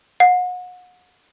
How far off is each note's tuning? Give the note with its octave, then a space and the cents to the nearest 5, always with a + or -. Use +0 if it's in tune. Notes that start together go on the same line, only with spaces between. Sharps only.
F#5 -35